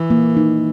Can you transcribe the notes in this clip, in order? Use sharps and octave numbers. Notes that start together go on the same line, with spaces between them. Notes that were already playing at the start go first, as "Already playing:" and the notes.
Already playing: E3
A#3
D#4